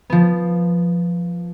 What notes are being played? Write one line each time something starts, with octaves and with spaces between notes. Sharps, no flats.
F3 B3